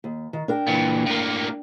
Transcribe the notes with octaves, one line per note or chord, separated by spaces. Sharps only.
D#2
D#3
D4 A#4 G5
A#2 E3
A2 A#3